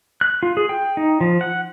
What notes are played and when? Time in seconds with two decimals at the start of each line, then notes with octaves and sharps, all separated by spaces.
0.21 F#6
0.43 F4
0.57 G#4
0.69 G5
0.97 D#4
1.21 F3
1.41 F#5